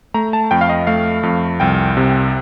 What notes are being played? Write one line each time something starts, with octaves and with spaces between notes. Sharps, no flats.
A3 A#5
A5
F2 G5
F5
D#5
A3 F5
F2
C2 G5
C3